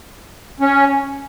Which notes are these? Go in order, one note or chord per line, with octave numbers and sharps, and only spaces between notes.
C#4